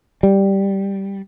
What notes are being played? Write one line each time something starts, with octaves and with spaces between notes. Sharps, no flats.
G3